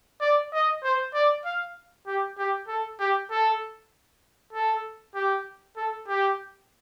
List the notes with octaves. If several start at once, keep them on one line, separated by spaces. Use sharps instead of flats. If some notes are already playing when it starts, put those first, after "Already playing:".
D5
D#5
C5
D5
F5
G4
G4
A4
G4
A4
A4
G4
A4
G4